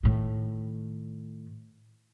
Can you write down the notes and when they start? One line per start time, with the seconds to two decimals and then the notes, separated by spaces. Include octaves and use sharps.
0.03 A2 D#3